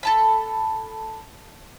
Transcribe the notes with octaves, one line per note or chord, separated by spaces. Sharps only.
A4 A5 B5